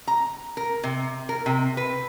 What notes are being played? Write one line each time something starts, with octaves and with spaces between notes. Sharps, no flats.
A#5
A#4
C3
A#4
C3
B4